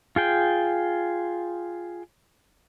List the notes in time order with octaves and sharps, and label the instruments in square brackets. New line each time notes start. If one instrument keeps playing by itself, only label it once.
[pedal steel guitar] F4 G#4 G5